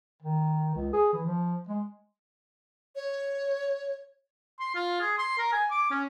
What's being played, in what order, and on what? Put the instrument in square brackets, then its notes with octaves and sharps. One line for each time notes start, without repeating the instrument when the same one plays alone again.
[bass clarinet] D#3
C#2
G#4
E3
F3
G#3
[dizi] C#5
[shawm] C6
F4
G#4
C6
A#4
G#5
D6
C#4